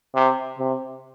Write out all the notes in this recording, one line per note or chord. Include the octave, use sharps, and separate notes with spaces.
C3
C3